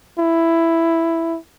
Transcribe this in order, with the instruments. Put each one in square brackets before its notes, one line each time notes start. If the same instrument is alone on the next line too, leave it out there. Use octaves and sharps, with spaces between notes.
[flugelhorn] E4